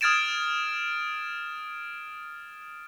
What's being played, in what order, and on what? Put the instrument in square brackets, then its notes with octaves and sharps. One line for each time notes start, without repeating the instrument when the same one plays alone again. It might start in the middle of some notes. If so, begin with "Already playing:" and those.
[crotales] D#6 F6 G#6 A6 D7 E7